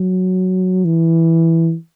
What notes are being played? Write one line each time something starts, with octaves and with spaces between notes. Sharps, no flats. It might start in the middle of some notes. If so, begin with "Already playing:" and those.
Already playing: F#3
E3